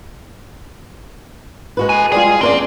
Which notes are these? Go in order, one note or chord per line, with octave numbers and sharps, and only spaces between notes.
G#3 F#4 B4
A4 G#5
G3 G#3 F4 G#4
F#2 C4 A#4 D5